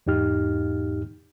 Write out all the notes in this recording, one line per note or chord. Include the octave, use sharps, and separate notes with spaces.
E2 G#2 D#4 G4 F6